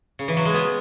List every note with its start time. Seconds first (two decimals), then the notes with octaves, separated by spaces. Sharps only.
0.19 C#3
0.28 E3
0.37 F#3
0.45 G#3
0.54 B3